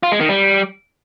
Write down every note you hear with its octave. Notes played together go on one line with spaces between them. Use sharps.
F4
G#3
D#3
G3